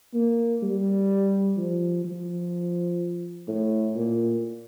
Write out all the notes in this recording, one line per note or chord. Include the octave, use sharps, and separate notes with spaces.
A#3
G3
F3
F3
A2
A#2